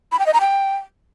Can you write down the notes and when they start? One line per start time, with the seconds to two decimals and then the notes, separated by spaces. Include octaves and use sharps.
0.12 B5
0.19 G5
0.26 D#5
0.34 A#5
0.41 G5